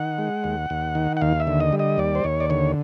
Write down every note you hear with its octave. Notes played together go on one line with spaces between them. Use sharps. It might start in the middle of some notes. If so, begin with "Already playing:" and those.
Already playing: D#3 F#5
G#3
D#2
D#2
D#3
F#5
D#2 F5
E5
D3
D#5
G3
D#5
D#2 D5
C5
D#2 C#5
D5
D3 C#5